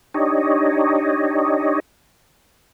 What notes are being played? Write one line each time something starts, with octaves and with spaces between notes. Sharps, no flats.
D4 D#4 G4 C#5 D#5